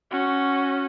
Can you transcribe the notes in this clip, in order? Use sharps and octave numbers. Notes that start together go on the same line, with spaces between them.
C#4 F#4